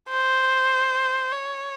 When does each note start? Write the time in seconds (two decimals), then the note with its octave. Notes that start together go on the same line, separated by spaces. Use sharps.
0.10 C5
1.33 C#5